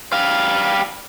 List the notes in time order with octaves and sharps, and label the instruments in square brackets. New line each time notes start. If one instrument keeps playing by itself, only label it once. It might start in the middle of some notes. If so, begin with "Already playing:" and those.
[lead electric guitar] G3 F5